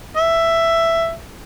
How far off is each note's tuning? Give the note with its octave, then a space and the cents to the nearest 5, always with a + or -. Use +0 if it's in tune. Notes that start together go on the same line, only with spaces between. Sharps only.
E5 +10